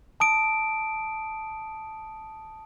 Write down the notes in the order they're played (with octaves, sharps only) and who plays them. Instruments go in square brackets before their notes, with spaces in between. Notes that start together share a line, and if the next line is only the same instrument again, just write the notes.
[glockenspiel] A5 D#6 D7